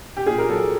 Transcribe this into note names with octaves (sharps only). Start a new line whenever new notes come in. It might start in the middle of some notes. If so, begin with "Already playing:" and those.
G4
A#2 G#4
A#4
F#3 A4